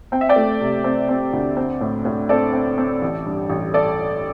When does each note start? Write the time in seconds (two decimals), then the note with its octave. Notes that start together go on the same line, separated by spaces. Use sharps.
0.12 C4 G5
0.21 E5
0.29 D5 G5
0.36 A3
0.61 C3
0.84 C4
1.09 C4
1.33 D2
1.57 C4
1.81 A2
2.05 A2
2.29 C4 A4 D5
2.53 C4
2.78 C4
3.02 A1
3.26 G2
3.50 A1
3.74 A4 D5